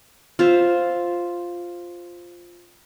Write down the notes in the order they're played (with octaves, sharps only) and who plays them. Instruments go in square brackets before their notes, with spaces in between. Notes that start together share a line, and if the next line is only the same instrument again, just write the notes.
[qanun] F4 C5 E5